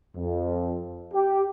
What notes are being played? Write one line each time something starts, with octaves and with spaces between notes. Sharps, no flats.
F2
G4